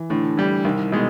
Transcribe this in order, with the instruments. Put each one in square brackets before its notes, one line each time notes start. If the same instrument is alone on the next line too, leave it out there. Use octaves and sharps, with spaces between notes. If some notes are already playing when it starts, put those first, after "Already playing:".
Already playing: [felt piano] E3
[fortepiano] A2 [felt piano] D3
[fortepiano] E3 G3
[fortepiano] C2 [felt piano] D#3
[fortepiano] B2 G#3